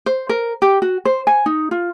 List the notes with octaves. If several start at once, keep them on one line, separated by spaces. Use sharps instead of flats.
C5
A#4
G4
F#4
C5
G#5
D#4
F4